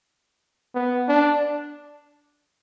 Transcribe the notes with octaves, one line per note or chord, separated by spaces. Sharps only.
B3
D4